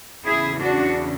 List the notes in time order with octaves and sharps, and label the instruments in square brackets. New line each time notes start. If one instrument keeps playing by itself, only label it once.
[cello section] E2 C#3 E3 E4 G#4
D4 F#4